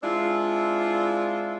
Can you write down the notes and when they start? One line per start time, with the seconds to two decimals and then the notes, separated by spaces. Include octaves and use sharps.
0.03 G#3 C4 D4 E4 F4